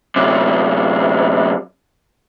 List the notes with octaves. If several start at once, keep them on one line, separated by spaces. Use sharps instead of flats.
F#2 C3